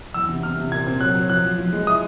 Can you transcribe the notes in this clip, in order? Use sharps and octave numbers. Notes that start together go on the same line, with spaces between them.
E2 E6
C3
C3 F6
C3
A#2 G#6
C4
F#3 F#6
F#3
F3 F#6
F3
F3
G#3
E4 D#6